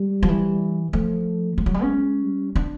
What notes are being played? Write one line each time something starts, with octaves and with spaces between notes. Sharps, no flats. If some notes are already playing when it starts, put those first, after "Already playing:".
Already playing: G3
F3
E3
F3 A3
F3 G#3
F#3
G3
C#4
G3
D4